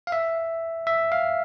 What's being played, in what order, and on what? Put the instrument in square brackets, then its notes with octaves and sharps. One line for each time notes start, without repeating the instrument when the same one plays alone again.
[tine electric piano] F5
E5
E5
F5